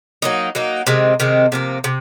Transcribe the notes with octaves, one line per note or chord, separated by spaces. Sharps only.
F#3 A#3 D#4
F#3 A#3 D#4
C3 D#3 G#3 C4
C3 D#3 G#3 C4
C3 F3 A#3
C3